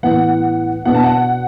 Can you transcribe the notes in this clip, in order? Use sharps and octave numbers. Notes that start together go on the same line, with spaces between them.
A2 E3 B3 F#5
B2 B3 D4 F#5
A5
F#5